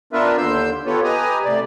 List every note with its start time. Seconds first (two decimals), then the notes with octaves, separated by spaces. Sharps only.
0.13 B3 D4 F4 A#4 B4 E5
0.37 D#2 D3 C6 E6 G6
0.86 B3 F4 G4 A4 B4 C#5
1.04 G4 B4 D#5 G#5 A#5 D#6
1.45 A2 C3 D5